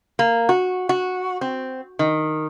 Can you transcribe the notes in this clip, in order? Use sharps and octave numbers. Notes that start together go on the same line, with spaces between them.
A#3
F#4
F#4
C4
D#3